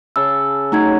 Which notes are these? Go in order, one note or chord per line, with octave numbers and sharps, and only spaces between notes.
C#3 A5 E6
F#3 A3 D#4 G#6